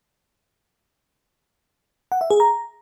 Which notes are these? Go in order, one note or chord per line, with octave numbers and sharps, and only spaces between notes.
F#5
E5
G#4
A#5